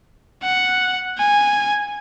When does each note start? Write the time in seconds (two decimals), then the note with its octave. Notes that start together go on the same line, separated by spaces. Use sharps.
0.43 F#5
1.18 G#5